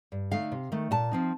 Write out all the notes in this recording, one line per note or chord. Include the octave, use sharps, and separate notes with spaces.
G2
D3 A3 D#4 F5
C3
D#3 A3
A#2 A5
F3 C4 D#4